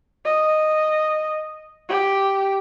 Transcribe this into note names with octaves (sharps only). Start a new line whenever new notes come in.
D#5
G4